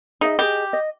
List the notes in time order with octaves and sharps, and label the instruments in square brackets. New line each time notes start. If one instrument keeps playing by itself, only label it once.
[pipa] D#4 [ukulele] G#4 D#5 E5
[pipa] G4 [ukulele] G#4 D#5
[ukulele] D#5